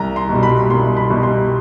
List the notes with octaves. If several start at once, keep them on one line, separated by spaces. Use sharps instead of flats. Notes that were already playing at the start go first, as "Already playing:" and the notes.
Already playing: C2 A#5
C6
B2
G3
B5
C2 C6
B5
B2 G3
C6